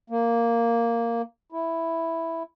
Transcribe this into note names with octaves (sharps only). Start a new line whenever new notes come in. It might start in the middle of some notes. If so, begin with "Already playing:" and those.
A#3
E4